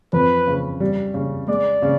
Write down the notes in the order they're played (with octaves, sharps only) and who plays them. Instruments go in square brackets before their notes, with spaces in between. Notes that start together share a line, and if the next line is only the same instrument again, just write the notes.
[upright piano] F2 [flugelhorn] B4
[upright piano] C#3
G3
C#3
[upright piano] G#3 [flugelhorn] D5
[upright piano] C#3